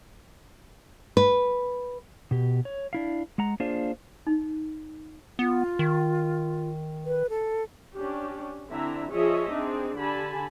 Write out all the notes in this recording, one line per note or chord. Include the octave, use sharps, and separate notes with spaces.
B4
B2 G4
C#5
D4 E4 F5
G#3 F#5 A#5
A#3 D4 F4 G#4 C5 F5
D#4
B3 F4
D#3
B4
A4
C#4 D4 G4
D3 C4 D4 E4 E5 A#5
F3 F4 G#4 C#5 D#5 E5
C4 D4 D#4 G#4
D3 G4 G#5 A5 B5